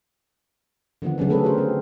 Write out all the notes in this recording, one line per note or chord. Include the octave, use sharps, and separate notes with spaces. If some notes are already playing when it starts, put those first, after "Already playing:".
D3 D#3 F3 B3 F#5
C#3 F#3 C#4 D4
F#3 A3 C4 G#4 A4 B4
C4 D4 F#4 G4 A#4 C5
C4